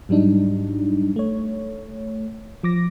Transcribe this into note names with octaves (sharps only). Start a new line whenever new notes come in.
G#2 F#3 G3 D4 D#4
A3 C#5
F3 D6 A#6